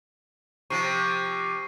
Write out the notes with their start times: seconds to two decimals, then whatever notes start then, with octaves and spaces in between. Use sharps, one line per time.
0.70 C3 F3 C#6 C7